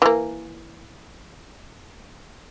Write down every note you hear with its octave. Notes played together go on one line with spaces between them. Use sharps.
E3 A#3